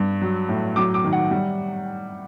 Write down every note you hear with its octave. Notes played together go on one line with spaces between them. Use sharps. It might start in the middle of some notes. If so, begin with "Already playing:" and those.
Already playing: G2
F#3
A2
F#3 D6
D6
D#3
F#5
G3